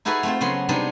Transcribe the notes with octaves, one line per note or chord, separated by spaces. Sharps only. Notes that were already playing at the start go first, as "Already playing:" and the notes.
D#4 E4 F#4 G#4 A4 B4
A3 C4 F4
C#3 F#3 B3 G#4 C6
C3 G3 B3 D4 D#4 G#4